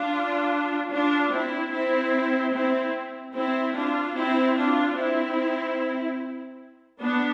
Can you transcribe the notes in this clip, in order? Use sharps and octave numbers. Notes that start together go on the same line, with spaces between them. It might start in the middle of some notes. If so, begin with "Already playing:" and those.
Already playing: D4 F4
D4 F4
C4 E4
C4 E4
C4 E4
C4 E4
D4 F4
C4 E4
D4 F4
C4 E4
B3 D4